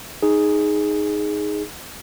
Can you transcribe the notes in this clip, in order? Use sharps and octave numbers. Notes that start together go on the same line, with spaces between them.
D#4 G#4